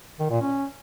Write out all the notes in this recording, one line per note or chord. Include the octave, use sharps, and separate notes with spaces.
D#3
A#2
C#4